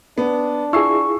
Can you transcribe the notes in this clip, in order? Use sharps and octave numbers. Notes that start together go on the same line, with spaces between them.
B3 D4
E4 F4 G#4 C#6 E6 C7